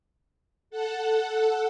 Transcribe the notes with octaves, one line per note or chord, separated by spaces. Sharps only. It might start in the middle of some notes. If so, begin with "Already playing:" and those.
A4 F#5